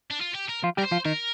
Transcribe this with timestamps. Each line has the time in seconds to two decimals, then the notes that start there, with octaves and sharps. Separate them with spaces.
0.11 D4
0.21 F4
0.35 G4
0.49 A#4
0.63 F3 F4
0.77 G3 G4 A#4
0.85 C5
0.91 F3 F4
1.05 D#3 D#4 A#4